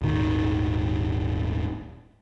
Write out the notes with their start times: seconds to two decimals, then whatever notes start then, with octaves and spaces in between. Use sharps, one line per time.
0.02 D#1 G#1 D#3